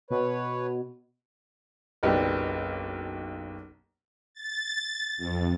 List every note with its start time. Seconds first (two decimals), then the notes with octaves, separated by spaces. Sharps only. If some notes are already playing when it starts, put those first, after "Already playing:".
0.10 B2 B4 C#5
2.03 F#1 B1 B3 D4 G4
4.34 A6
5.17 F2